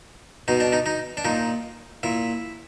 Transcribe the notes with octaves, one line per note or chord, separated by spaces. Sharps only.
B2 D#4
D4
D#4
D#4
D4
A#2 D#4
A#2 E4